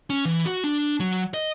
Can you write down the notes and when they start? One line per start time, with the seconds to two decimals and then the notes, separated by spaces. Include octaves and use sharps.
0.10 C#4
0.25 E3
0.46 F#4
0.64 D4
1.00 F#3
1.34 D#5